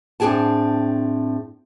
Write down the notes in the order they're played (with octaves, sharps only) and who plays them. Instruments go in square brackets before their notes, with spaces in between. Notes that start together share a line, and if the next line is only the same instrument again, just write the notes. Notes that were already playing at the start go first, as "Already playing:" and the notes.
[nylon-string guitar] A2 C4 D4 G#4 G5 A5